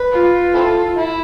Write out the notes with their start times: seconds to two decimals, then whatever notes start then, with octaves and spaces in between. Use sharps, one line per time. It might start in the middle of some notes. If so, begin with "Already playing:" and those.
Already playing: B4
0.12 F4
0.54 C4 E4 A4
0.97 E4